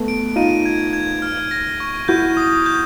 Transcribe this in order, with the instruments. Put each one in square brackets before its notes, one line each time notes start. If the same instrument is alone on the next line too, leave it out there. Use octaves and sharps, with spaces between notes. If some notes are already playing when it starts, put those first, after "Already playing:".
Already playing: [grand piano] A3 B3
[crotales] D7
[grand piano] D#4 F4 [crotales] D#7
[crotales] G#6
G#6
F6
A#6
C#6
[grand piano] E4 F#4 [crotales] G6
[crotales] D#6
G6